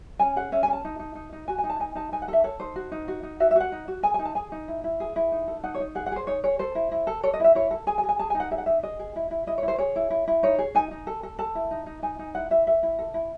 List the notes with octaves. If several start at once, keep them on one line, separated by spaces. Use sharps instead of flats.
C#4 G#5
G#4 F#5
C#4 E5
G#5
C#4
A5
D#4
D#4
D#4
D#4
F#4 G#5
G#5
D#4
A5
D#4 G#5
D#4 A5
D#4 G#5
F#5
A4 E5
A4 C#5
D#4 C5
F#4
D#4
F#4
D#4
F#4 E5
E5
F#4
F#5
D#4
F#4
G#4 G#5
G#5
D#4
A5
G#4 G#5
D#4
E4
E4
G#4
E4
D#4
A4
D#4 F#5
C#5
D#4
G#4 F#5
F#5
G#4 C5
D#4 C#5
G#4 C#5
A4 C5
E4
E4
A4
A4 C#5
D#5
E4 E5
E4 C#5
A4
G#4 G#5
G#5
G#4
G#5
G#4 A5
G#5
D#4
F#5
G#4 E5
F#5
D#4 E5
G#4 D#5
G#4
E4
E4
E4 D#5
C#5
E4
C5
G#4 C#5
E4
E4
E4
D#4 C#5
G#4
D#4 G#5
D#4
A4
A4
A4 A5
E4
D#4
D#4
D#4 G#5
D#4
E4 F#5
E4 E5
A4 E5
E4
A4
E4